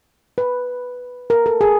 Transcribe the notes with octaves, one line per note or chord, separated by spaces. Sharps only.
B4
A#4
A4
G#4